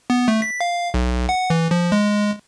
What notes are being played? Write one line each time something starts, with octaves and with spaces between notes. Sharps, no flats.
B3
A3
B6
F5
B1
F#5
E3
F3
G#3